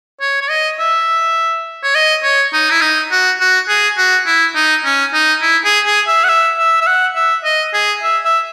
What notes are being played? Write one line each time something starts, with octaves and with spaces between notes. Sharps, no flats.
C#5
C#5
D#5
E5
C#5
D#5
C#5
D#4
E4
D#4
F#4
F#4
G#4
F#4
E4
D#4
C#4
D#4
E4
G#4
G#4
E5
F#5
E5
E5
E5
F#5
E5
D#5
G#4
E5
E5